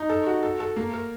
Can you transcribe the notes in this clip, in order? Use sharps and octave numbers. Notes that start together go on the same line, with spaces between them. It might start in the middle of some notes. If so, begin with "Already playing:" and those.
Already playing: D#4
A4
F#4
A4
A4
A#3
A#4